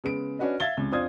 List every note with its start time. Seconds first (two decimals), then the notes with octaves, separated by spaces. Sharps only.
0.04 C#3 G#3 B3 D7
0.39 C#4 D4 F#4 B4 D#5
0.60 E5 F5 G#6 A6 G7
0.77 C#2 C3
0.91 F2 D4 F4 C5 D#6 G#6